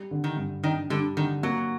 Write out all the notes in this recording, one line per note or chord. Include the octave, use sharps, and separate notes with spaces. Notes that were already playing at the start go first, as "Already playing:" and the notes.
Already playing: G3
D3
D#3
G2
D#3 D4
D3 G3
D3 D#3
F#3 A#3